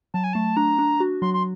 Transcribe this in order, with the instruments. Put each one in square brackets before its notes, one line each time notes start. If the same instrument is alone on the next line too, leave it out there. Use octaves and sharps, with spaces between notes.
[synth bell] F#3 [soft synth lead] A5
[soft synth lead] G#5
[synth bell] A3 [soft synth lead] A5
[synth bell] D4 [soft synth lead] A#5
[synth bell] D4
F#4
[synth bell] F#3 [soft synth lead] C6
[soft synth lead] C6